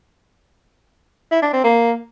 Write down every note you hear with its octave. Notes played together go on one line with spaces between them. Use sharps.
E4
D4
C4
A#3